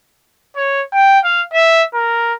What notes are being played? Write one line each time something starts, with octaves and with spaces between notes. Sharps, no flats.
C#5
G5
F5
E5
A#4